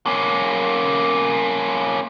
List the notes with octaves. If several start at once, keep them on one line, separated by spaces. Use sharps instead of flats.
A#3 C#4